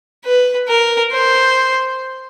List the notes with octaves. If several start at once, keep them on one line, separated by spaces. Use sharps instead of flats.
B4
A#4
C5